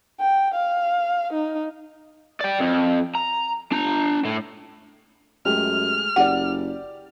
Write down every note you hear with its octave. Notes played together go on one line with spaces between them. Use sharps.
G5
F5
D#4
D5 G5
F2
A#5
D4 A#5
A2
F#2 G#3 A3 G4 F6
F#1 G4 D5 F#5